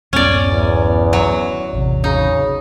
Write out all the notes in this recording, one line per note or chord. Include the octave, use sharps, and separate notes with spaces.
D1 F#2 B3 C#4 D5
E2
F#3
A1 E2 C3
C#3 D#4